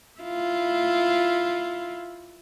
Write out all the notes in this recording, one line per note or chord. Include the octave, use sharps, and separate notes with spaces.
E4 F4